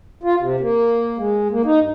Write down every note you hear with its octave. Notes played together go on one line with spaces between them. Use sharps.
F4
C3
A#3
G#3
A#3
D#4
G2